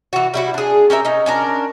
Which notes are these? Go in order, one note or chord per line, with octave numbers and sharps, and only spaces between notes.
E3 F#4
G3 E4 F#4
D4 G#4
C#4 G4 A#4 E5
C#4 D#4
C#4 D4 A#4